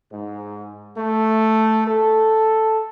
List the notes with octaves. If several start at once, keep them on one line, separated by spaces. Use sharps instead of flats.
G#2
A3
A4